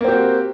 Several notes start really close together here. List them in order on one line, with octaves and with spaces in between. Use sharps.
A#3 C4 G4 F#4